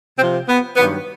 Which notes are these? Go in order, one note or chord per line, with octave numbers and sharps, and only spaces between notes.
C3 F3 C4
B3
G2 D#3 F#3 B3